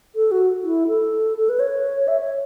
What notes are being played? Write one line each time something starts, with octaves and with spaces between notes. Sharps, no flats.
A4
F#4
E4
A4
A4
B4
C#5
E5
C#5